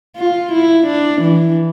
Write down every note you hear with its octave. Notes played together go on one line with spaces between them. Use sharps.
F4
E4
D4
E3